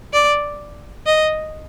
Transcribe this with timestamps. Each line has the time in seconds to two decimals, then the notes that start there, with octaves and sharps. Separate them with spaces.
0.13 D5
1.06 D#5